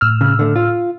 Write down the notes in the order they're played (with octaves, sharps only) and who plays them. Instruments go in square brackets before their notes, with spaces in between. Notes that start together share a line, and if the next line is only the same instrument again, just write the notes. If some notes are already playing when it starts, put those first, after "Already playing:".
[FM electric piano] A2 E6 F6
[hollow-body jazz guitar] C#3
D3 A3
F4